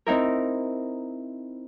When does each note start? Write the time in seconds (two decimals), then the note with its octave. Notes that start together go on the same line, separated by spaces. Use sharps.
0.07 C4 D#4 E4 A#4